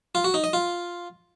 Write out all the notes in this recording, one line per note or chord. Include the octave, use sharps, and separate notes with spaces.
F4
F#4
D#4
D#5
F4